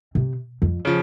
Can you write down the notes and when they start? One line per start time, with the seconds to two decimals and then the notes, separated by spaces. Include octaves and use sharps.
0.15 C3
0.62 F2
0.85 C#3 F3